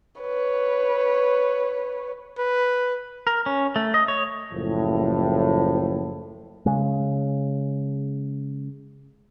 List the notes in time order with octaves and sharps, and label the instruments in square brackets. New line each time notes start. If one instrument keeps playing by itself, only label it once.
[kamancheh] B4 C#5
[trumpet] B4
[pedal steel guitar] A#4
C#4
A3
D#5
C#5
[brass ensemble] F#1 A2 F3
[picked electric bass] C#3 G#3